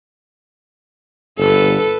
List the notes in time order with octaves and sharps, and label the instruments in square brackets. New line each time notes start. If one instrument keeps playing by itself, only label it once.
[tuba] G1 [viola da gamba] A4 B4